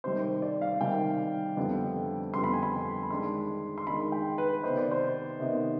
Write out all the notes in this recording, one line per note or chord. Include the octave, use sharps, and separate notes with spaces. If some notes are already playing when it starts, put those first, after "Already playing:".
C3 D#3 G3 C5
C5
D5
F5
C3 D#3 G3 G5
F2 D3 G3 B3
F2 D3 G3 B3 C6
B5
G#5
B5
B5
D#3 G#3 D4 C6
C6
D#3 G#3 D4 B5
G5
B4
C3 D#3 B3 D#4 C5
D5
C5
C3 D#3 B3 D#4